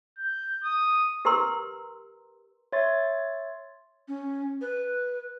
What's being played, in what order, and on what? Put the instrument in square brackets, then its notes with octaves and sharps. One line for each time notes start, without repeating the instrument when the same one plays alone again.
[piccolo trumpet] G6
D#6
[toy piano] G4 A#4 B4 A#5 C6 E6
[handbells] C#5 E5 C6 A6
[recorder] C#4
B4